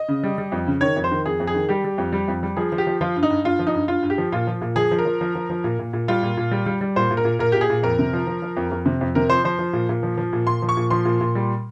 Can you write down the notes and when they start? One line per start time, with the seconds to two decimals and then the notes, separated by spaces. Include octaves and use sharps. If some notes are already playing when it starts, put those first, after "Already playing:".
Already playing: D#5
0.08 C#3
0.23 G3
0.38 G3
0.52 F2
0.67 C#3
0.81 D#3 C#5
0.96 F2
1.04 C5
1.11 D#3
1.25 F2 G#4
1.40 F2
1.47 G#4
1.55 D#3
1.69 G3 G4
1.84 G3
1.98 F2
2.12 G3
2.28 F2
2.43 G3
2.57 F3 G#4
2.72 F3
2.78 G4
2.87 F3
3.01 F3 F4
3.16 G2
3.23 D#4
3.31 G2
3.45 G2 F4
3.59 F3
3.67 D#4
3.74 G2
3.88 G2 F4
4.03 G2
4.10 G4
4.18 F3
4.32 A#2 F4
4.47 F3
4.61 A#2
4.76 F3 G#4
4.91 F3
4.99 A#4
5.05 F3
5.21 F3
5.35 F3
5.50 F3
5.64 A#2
5.79 A#2
5.93 A#2
6.08 G3 F4
6.23 A#2
6.37 A#2
6.51 G3
6.66 G3
6.81 G3
6.96 A#2 C5
7.11 A#2
7.17 A#4
7.25 A#2
7.39 A#2 A#4
7.52 A#2 G4
7.61 G#4
7.70 A#2
7.83 F2 A#4
7.99 C3
8.13 F3
8.27 F3
8.42 F3
8.57 F2
8.71 F2
8.86 C3
9.01 F2
9.15 C3 A#4
9.30 F3 C5
9.44 F3 C5
9.59 F3
9.73 A#2
9.89 A#2
10.03 F3
10.18 F3
10.33 A#2
10.47 A#2 C6
10.62 F3
10.69 C#6
10.77 A#2
10.90 F3 C6
11.05 A#2
11.21 A#2
11.35 G3